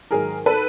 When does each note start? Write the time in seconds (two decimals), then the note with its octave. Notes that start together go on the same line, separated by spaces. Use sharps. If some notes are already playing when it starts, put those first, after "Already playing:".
0.11 G#2 D#3 F#3 G#4 A#4
0.46 A4 B4